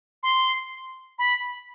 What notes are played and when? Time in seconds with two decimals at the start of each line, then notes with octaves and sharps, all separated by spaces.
0.23 C6
1.19 B5